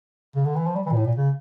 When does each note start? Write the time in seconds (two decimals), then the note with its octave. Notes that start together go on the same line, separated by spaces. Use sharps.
0.36 C#3
0.45 D3
0.56 E3
0.66 F3
0.76 G3
0.86 E3
0.91 A#2
0.96 A2
1.06 A#2
1.17 C#3